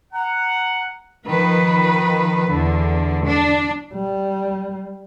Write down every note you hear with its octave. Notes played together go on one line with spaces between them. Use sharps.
F#5 A#5
D#3 F3 B4
E2 D3
D4
G3